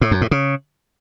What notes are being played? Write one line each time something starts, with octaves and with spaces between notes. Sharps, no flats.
A2
F#2
A2
C#3